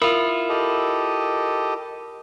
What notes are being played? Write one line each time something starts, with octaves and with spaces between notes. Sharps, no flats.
E4 F4 A#4
G4 A4 D#5